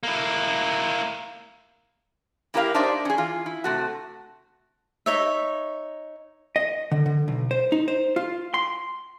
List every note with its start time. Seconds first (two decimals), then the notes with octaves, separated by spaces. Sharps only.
0.03 A#3 E4
2.54 A#3 E4 G4 A#4 D#5 F5
2.74 D4 D#4 G4 C5 D5 E5
3.05 C#4 G#4
3.18 E3 F4
3.46 E4
3.64 C3 A3 F#4
5.06 D#4 C#5 E5
6.56 D#5
6.91 D3
7.06 D3
7.28 B1
7.51 C5
7.72 D#4
7.88 C5
8.16 F4
8.54 C6